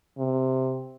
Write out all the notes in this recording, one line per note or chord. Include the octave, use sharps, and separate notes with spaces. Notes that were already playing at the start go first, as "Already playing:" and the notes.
C3